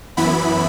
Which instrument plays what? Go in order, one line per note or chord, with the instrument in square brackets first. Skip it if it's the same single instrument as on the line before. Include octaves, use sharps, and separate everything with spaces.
[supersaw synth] F#2 E3 B3 E4 B5